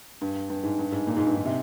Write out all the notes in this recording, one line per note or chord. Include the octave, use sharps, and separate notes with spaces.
G2
G2
G#2
G2
G#2
A#2
G#2
G2
G#2
C3